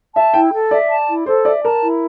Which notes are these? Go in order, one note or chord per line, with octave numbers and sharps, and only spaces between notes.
E5 A5
E4 G5
A4
D5 E5
A5
E4
A4 C5
D5 E5
A#4 A5
E4